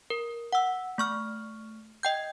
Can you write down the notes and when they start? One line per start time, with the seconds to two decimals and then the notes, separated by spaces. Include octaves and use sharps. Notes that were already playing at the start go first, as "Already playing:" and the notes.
0.10 A#4
0.53 F#5 E6
0.98 A3 C#6 F6
2.03 D#5 G5 G6